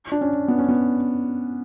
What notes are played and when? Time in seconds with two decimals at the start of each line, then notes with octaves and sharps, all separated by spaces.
0.12 D4
0.21 C#4
0.48 B3
0.58 C#4
0.69 B3